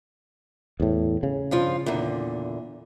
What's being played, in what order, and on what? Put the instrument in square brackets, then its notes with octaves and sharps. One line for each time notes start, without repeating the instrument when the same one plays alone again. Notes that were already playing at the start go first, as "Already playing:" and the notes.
[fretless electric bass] E2 A2
C#3
[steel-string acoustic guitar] G2 F3 F4
E2 A#2 D3